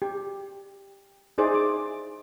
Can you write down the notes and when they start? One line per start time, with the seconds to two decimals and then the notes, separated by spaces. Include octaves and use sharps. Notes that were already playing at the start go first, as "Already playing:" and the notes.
0.02 G4
1.38 D#4 E4 G#4 C5 D5
1.54 D6